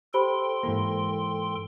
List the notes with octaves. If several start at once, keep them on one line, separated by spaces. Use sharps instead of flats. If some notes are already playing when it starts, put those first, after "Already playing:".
G4 A4 C5 G5 B5 C6
G#2 E3 A#3